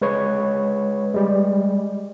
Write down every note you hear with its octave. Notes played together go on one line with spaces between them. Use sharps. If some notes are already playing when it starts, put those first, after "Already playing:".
G#3 B4 C#5
G3 G#3